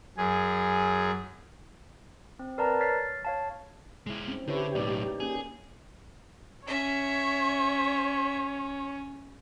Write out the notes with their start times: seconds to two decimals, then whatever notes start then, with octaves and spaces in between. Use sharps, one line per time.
0.17 F#2 G#4
2.39 C4
2.58 A#4 B4 D5 A5 A#5
2.80 C#5 F6 A6 B6 C7
3.25 C#5 F5 A5
4.07 G#3 E4
4.28 C4 C#4
4.48 D3 E4 G4 B4 C#5
4.75 B1 A2 D#4 D5
5.20 A#3 C#4 G#4
6.67 C#4 C#5 E5